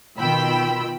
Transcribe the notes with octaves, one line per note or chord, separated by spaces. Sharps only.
B2 D#3 F4 G5 B5 E6